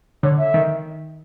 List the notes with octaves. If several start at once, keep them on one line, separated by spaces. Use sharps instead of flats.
D3 C#5
E5
D#3